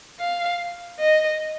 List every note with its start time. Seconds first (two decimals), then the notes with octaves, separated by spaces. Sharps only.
0.20 F5
1.00 D#5